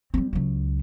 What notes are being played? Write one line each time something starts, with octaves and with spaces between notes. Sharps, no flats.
G3 C4
C#2 F#3